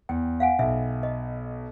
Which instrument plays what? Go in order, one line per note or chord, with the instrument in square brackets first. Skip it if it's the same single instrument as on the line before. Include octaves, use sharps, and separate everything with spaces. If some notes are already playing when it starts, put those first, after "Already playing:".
[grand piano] E2 [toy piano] G5
[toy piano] F5 F#5 G#5
[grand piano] B1 [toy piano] E5
[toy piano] D#5